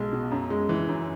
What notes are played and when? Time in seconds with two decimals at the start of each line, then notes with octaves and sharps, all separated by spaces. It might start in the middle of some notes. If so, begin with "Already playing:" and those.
Already playing: B1 G#3
0.12 B2
0.31 F#2
0.50 G#3
0.69 E3
0.88 F#2